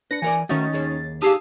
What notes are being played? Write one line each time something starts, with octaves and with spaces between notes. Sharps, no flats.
D4 B4 A#6 C#7
E3 A#4 D5 G#5
D#3 A3 C#4 D#4 F#4 E5 A6
D#2 G#4 C#5
D#4 G4 G#4 F5 A5 D#6 E6 C7